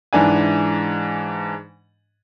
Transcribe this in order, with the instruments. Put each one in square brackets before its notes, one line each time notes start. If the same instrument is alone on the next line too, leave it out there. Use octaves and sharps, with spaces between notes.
[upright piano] G#2 E3 D4 G#5